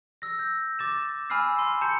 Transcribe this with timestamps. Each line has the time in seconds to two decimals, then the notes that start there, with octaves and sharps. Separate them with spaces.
0.22 E6 A#6
0.39 G6
0.79 D6 A6 E7
1.30 G#5 B5 E6 F6 C7
1.59 C6
1.81 A5 A#5 G6 C#7